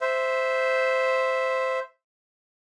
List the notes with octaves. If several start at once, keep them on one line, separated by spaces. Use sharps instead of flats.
C5 E5